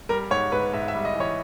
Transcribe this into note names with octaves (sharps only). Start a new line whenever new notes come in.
G3 A#4
G#2 C#5
G#2 B4
G#2 E5
E5
G3
D#5
E3
C#5